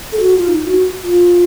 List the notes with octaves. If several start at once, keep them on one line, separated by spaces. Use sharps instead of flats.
A4
F#4
F4
D#4
F#4
F4